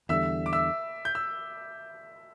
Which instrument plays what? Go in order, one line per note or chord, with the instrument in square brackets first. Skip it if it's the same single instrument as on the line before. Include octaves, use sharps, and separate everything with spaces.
[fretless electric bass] E2 D3 G3 [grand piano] E5 E6
[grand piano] D6
E5 E6
G6
E6